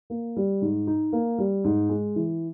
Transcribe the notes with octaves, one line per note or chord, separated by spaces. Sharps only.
A#3
G3
G#2
D#4
A#3
G3
G#2
G#3
E3